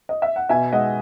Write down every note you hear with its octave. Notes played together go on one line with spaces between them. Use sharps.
D#5
E5
F#5
B2 E5 G#5
G#3 D#5 F#5